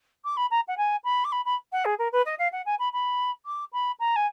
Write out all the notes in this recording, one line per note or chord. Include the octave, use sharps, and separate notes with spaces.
D6
B5
A#5
F#5
G#5
B5
D6
B5
B5
F#5
G#4
A#4
B4
D#5
F5
F#5
G#5
B5
B5
D6
B5
A#5
G#5